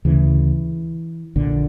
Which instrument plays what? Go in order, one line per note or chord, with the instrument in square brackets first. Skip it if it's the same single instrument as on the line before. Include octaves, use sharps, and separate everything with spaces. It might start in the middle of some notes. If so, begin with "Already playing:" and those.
[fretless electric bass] D2 C#3 E3
A#1 A#2 D3